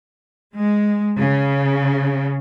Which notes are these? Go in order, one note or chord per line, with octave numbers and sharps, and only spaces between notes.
G#3
C#3